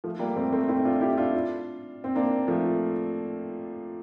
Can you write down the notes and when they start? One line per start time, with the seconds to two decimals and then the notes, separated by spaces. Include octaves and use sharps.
0.04 F3 A3
0.19 G3 A#3
0.36 A3 C4
0.52 A3 C4
0.68 C4 E4
0.84 D4 F4
1.01 E4 G4
1.17 D4 F4
2.04 C4
2.15 A#3 D4
2.48 F3 A3